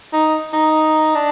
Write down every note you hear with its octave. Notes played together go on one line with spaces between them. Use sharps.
D#4
D#4
D4